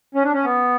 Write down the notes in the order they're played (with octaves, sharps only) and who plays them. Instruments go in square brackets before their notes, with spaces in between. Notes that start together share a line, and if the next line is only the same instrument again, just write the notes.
[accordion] C#4
D4
C#4
B3